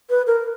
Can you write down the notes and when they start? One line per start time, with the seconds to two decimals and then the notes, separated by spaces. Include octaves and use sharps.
0.10 B4
0.27 A#4